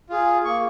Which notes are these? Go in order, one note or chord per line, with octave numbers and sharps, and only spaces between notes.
F4 G#4
A#3 C#6